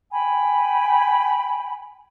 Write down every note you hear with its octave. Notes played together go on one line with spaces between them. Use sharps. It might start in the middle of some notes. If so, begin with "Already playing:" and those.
G5 G#5 B5